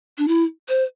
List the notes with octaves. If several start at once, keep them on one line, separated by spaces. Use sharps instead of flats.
D4
E4
C5